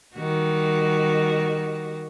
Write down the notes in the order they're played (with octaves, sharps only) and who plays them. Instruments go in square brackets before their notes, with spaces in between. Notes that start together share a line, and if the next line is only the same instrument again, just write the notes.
[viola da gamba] D#3 G3 F#4